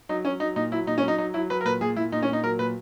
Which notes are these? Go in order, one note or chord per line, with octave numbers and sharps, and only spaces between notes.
F#3 D#4
F#3 C#4
F#3 D#4
A#2 D#4
F#3 E4
A#2 D#4
C#4
F#3
D#4
F#3 D#4
F#3 E4
F#3 B4
A#4
A#2 B4
A#2 G#4
A#2 E4
A#2 D#4
C#4
A#2
D#4
F#3 A#4
A#2 B4